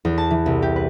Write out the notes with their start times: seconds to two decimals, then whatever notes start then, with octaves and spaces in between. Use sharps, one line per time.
0.05 E2
0.18 A5
0.31 E3
0.46 C2
0.62 G4
0.76 B4